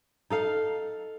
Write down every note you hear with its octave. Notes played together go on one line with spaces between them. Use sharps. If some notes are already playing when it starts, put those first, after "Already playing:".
D#4 A4 F5